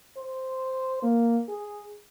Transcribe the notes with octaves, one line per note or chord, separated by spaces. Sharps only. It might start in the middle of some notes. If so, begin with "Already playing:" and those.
C5
A#3
G#4